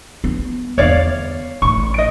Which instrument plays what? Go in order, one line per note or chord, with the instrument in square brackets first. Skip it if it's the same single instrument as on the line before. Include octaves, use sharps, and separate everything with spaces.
[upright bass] B3
[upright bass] E2 D3 [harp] C#5 D5 F5
[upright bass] A1 [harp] C#6
[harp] D#5 D7